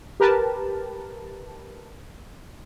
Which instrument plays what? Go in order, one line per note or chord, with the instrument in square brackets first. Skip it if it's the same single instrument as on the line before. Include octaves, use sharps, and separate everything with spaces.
[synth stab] G4 A#4 B4 A5